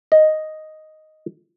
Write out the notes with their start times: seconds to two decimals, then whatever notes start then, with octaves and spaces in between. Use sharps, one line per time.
0.12 D#5